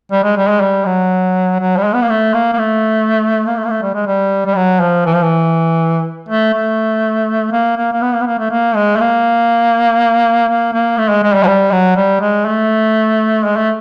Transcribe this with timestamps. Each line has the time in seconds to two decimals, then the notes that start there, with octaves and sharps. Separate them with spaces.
0.12 G3
0.24 G#3
0.37 G3
0.49 G#3
0.61 G3
0.86 F#3
1.60 F#3
1.77 G3
1.85 G#3
1.94 B3
2.02 A#3
2.09 A3
2.34 A#3
2.54 A#3
2.58 A3
3.47 A#3
3.57 A3
3.65 A#3
3.70 A3
3.82 G3
3.95 G#3
4.07 G3
4.46 G3
4.56 F#3
4.80 F3
5.06 E3
5.15 F3
5.23 E3
6.29 A3
6.54 A3
7.52 A#3
7.77 A#3
7.93 A#3
8.02 B3
8.14 A#3
8.21 B3
8.27 A#3
8.39 A3
8.51 A#3
8.76 G#3
8.96 A3
9.01 A#3
10.48 A#3
10.73 A#3
10.98 A3
11.10 G#3
11.23 G#3
11.35 G3
11.43 F#3
11.47 G3
11.72 F#3
11.97 G3
12.21 G#3
12.46 A3
13.45 G#3
13.57 A3